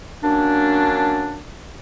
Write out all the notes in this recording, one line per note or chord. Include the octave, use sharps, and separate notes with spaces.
F#3 A#3 C#4 D4